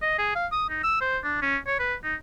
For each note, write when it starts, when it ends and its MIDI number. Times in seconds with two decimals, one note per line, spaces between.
0.02 0.14 75
0.19 0.31 68
0.36 0.47 77
0.52 0.66 87
0.70 0.81 63
0.84 0.97 88
1.01 1.18 72
1.24 1.41 62
1.42 1.57 61
1.67 1.75 73
1.80 1.95 71
2.04 2.15 63